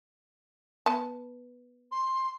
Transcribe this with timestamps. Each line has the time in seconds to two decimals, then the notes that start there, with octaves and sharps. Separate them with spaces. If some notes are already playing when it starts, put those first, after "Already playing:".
0.86 B3 A5
1.91 C6